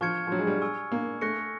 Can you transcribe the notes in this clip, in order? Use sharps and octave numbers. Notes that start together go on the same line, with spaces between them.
F3 C#6 F6 G#6 C#7
F3
F#3
G#3
G3
G#5 C#6 E6
A#3
A3 C#6 F#6 A#6 C#7